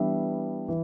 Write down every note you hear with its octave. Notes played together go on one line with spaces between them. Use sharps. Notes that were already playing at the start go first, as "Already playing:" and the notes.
Already playing: E3 G3 B3 D4 E5
E3